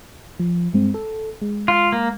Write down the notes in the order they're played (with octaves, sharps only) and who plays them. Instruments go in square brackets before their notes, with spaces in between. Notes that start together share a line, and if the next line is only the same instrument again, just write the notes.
[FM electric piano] F3
G2 G#3 C4
A4
G#3
[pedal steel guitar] F4
A#3